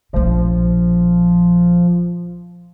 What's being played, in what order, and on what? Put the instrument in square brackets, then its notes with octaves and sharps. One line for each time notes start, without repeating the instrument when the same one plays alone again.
[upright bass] A#1 B2 [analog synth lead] F3